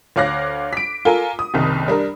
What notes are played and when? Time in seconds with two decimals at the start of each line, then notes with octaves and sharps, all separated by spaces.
0.16 D2 C#5 F5 D6 F#6 A#6
0.73 B6 D7
1.05 F4 A4 A#4 G#5
1.39 D#6
1.54 F#1 C2 D#3
1.88 G3 D4 A#4